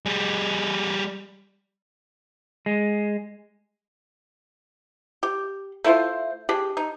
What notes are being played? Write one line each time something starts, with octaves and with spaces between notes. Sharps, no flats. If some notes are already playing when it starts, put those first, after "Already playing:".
G3 G#4
G#3
G4
A3 E4 F4 C5
D4 G4 G#4
D#4